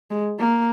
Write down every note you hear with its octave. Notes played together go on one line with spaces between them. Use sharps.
G#3
A#3